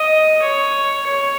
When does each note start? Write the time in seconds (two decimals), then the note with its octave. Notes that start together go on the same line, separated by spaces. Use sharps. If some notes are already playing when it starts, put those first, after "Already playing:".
Already playing: D#5
0.42 C#5
1.06 C#5